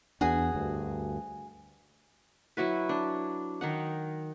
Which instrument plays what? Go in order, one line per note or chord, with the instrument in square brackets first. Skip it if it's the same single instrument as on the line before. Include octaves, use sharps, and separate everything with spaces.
[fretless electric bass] E2 B3 D4 [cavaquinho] F#4 G#4
[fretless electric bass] D2 G2
[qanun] F#3 E4 F#4 B4
D4
D#3 D#4 F#5